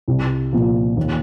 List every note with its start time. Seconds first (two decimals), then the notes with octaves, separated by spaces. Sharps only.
0.08 C2
0.53 A#2 F3
0.97 D#2